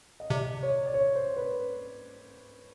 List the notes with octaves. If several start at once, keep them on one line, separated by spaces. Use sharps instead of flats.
D#5
C3 D5
C#5
D5
C#5
C5
B4